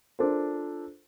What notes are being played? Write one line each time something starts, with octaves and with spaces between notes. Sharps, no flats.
D4 F4 A4 A#4 C5